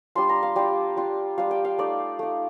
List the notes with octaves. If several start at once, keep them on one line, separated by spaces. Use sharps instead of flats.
G3 D4 F4 C6
A#5
F5
G3 D4 F4 G5
G3 D4 F4
G3 D4 F4 F5
G5
F5
A3 D#4 D5
A3 D#4